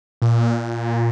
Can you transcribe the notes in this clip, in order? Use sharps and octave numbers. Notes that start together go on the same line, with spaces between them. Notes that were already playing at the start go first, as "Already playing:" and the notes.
A#2